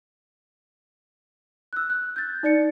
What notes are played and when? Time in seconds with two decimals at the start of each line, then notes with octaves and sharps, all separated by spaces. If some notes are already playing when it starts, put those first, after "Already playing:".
1.73 E6 F#6
1.90 F#6
2.16 G6 A6
2.43 D#4 D5 A6 C#7